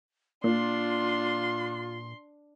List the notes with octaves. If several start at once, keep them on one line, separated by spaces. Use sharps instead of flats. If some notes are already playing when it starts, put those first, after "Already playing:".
A#2 D4 F4 C6